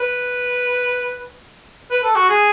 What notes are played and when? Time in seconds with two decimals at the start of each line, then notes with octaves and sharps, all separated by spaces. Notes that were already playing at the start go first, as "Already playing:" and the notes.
Already playing: B4
1.91 B4
2.04 A4
2.16 F#4
2.29 G#4